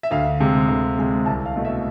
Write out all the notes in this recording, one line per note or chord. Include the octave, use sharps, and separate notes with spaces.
E5
D2 F5
C3 G#3
D2
C3 G#3
C2 A5
F5
B2 A3
E5